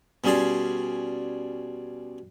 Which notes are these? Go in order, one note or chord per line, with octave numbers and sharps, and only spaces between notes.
B2 G3 C#4 G#4 D5 C6